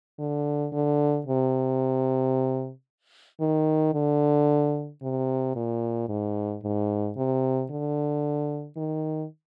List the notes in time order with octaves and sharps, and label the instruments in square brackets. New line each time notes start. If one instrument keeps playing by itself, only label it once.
[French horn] D3
D3
C3
D#3
D3
C3
A#2
G#2
G#2
C3
D3
D#3